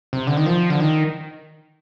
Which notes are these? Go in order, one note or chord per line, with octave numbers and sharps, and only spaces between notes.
C3
D3
D#3
F3
D3
D#3